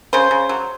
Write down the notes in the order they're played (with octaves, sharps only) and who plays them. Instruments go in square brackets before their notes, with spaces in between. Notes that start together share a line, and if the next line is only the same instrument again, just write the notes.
[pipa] C#3 C5
C#3
F#3